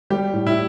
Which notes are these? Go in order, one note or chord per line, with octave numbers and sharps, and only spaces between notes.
G3 G4
A2
E4